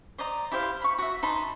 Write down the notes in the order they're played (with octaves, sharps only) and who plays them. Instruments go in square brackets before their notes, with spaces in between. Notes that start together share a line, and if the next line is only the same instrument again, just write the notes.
[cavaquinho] C5 D5 D#5 A#5
E4 G4 C5 F5
B5 C#6
F#4 E5
D#4 A5 B5 C6